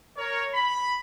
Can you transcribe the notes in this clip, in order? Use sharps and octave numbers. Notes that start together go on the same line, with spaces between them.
A#4 C#5
B5